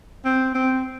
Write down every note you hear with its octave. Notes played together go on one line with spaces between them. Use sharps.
C4
C4